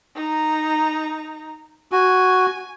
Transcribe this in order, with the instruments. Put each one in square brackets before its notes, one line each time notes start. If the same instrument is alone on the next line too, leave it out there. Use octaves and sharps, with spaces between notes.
[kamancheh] D#4 A#5
[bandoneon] F#4 [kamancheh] G#5